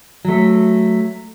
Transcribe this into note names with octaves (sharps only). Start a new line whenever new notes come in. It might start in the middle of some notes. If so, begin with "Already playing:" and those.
F#3 A3